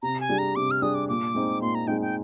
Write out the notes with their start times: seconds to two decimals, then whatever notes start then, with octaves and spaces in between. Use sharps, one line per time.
0.02 C3 A#5
0.20 G#5
0.29 G3 D4 G#4
0.38 A#5
0.56 C3 D6
0.71 F6
0.82 G3 D4 G#4 D#6
0.95 D6
1.09 A#2 D6
1.35 G#3 C4 D#4
1.61 A#2 C6
1.75 A#5
1.87 G#3 C4 D#4 G5
2.01 G5